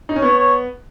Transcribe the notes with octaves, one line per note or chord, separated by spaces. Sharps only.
D#4
C#4
B3 C#5
C#5